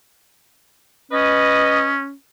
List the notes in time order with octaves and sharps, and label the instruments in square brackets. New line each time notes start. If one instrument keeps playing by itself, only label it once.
[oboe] C#4 [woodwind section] B4 D#5